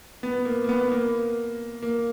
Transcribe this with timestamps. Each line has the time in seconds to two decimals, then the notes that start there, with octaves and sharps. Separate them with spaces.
0.23 B3
0.45 A#3
0.64 A#3
0.69 B3
0.92 A#3
1.83 A#3